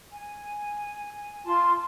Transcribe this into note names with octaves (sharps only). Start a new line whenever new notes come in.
G#5
F4 A5 C6